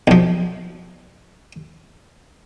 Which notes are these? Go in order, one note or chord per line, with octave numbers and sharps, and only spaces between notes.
B1 F3